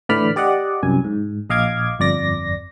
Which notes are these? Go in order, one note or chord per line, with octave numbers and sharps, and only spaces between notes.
A2 D3 E3 D5 B5 F6
G4 D5 D#5 F#5
C2 F#2 G#5
G#2
A#1 D#5 F5 D6 G#6
G1 F2 D5 A#6